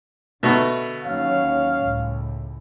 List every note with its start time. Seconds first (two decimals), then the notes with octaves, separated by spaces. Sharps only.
0.43 B2 D3 A3
1.04 D#2 F#3 C#4 C#5 F5
1.78 C#2 A2